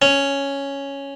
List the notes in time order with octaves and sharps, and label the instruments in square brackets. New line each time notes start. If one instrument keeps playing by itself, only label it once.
[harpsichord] C#4